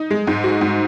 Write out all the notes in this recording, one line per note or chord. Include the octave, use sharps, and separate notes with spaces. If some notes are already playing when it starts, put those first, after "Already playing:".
Already playing: D#4
G#3
G#2
F#4
G#2